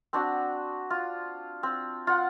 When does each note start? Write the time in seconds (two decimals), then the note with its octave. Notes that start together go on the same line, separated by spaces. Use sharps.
0.13 C4 D4 F#4
0.90 F4
1.63 C4
2.07 F4 F#5